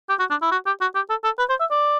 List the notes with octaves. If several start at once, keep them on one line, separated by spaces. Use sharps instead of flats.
G4
F#4
D4
E4
F#4
G4
F#4
G4
A4
A4
B4
C5
E5
D5